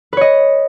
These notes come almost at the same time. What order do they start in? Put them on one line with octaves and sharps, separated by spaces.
B4 C#5 D#5